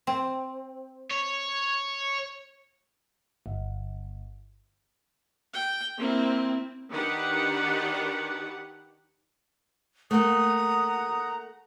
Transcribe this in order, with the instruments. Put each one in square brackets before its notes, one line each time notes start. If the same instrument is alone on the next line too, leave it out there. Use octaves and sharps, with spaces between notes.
[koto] C4
[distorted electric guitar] C#5
[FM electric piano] G1
[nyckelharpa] G5
[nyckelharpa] A#3 E4 [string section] C4
[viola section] D#3 D4 G4 B4 F#5
[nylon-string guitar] A3 A#3 [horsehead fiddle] F#5 A#5 [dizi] D#6